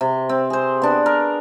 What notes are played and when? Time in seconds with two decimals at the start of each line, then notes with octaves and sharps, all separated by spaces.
0.01 C3
0.29 C4
0.50 G#4 C5
0.82 B3 D4
1.06 A#4